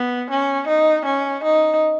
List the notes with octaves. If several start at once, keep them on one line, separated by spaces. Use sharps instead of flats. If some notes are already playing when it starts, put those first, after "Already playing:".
Already playing: B3
C#4
D#4
C#4
D#4